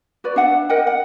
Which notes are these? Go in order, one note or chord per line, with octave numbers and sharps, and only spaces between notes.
F#4 B4 D5
D4 E5 F#5
A#4 D#5 F#5 G5
F#5